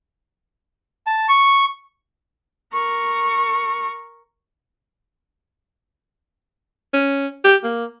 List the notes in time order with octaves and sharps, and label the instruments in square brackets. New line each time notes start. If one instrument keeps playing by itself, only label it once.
[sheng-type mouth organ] A5
C#6
[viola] A#4 C#6
[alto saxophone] C#4
G4
A#3